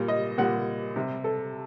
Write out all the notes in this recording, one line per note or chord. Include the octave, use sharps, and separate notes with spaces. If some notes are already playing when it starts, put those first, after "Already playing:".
Already playing: A#2 G3
D#5
A#2 G3 F#5
C3 G3
A4